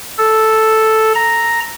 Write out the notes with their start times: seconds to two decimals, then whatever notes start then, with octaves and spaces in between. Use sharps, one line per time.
0.18 A4
1.15 A#5